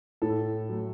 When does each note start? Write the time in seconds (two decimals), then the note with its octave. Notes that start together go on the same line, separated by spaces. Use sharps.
0.22 A2 A4
0.69 F#3 A3